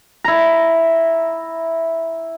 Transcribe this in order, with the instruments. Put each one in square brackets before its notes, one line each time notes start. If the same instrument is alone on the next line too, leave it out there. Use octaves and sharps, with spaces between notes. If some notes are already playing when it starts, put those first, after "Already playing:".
[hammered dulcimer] E4 A#5